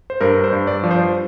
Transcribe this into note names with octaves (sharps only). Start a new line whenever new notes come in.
C5
G2 A#4
C5
G2
D5
F3
C5